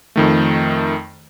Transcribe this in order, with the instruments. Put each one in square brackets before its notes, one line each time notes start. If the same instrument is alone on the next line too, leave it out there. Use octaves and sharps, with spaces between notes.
[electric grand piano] F2 D#3 A3